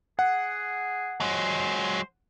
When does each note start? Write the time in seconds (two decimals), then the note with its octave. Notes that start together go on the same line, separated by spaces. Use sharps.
0.19 G#4 F#5
1.20 F#3 G#3 C5